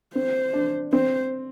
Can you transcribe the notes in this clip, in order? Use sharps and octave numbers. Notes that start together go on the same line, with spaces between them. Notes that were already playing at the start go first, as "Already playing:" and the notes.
C4 C5
D4
C4 C5